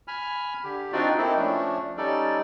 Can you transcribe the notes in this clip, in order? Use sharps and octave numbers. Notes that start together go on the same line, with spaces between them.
G#5 B5 F6
D3 G4
C4 D4 D#4 F4 F#4 D5
A#3 C4 D#4 E4 A4
F3 A3 C#4 D4
G3 C#4 D#4 A4 D5